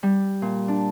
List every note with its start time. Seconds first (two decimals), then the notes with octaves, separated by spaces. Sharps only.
0.03 G3
0.42 A#2
0.68 D4